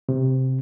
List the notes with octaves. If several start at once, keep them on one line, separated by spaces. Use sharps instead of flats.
C3